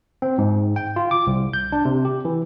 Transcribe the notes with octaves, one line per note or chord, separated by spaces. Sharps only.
C4
G#2
G5
F4
D6
C2
G6
D4
C3
G4
E3